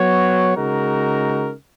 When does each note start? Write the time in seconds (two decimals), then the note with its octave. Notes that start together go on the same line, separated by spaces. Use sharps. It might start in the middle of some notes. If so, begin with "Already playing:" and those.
Already playing: F#3 B3 F#4 C#5
0.56 C#3 G#3 D#4 F#4 A#4